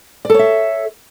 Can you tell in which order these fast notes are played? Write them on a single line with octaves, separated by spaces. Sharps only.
D5 A4 C#5 E5